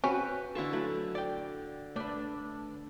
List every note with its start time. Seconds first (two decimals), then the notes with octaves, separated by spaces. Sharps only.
0.04 C4 C#4 F#4 B4
0.55 D3 E4 F4 A4 C#6
0.73 F#3 A3 E4
1.15 D5 G5
1.96 A3 D4 B4